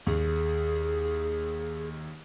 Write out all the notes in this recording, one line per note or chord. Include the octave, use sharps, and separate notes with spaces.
D#2 G#4